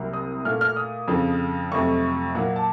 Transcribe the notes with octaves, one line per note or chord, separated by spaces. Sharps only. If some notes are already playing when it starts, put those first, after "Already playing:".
Already playing: C2 C3 F#3 A#3
D#6
A#2 A3 F6
F6
D#6
F2 C#3 F3
F2 C3 F#3 A3 C#6
A#2 F#3 A#3 F#5
F#5
A5